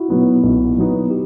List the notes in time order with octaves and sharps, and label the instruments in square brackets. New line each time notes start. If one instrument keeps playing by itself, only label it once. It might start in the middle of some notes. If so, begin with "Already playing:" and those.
Already playing: [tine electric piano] E4 F#4
[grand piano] B2 F#3 B3 D#4
B1
B2 F#3 B3 D#4
[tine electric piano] G4